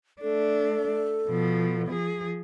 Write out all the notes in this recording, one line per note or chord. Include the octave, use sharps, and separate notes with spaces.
A3 D4 A4
B2 F3
F3 G#4